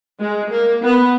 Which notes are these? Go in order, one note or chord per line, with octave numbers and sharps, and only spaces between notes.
G#3
A#3
B3